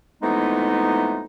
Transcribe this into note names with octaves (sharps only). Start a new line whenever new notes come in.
F2 E3 G#3 A3 B3 D#4